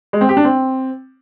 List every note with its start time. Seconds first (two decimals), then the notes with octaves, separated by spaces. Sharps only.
0.13 G#3
0.21 C4
0.29 G4
0.37 D4
0.45 C4